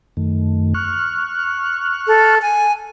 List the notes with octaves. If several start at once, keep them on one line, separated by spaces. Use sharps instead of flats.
F#2 D#3 A3
C#6 F6 F#6
A4
G#5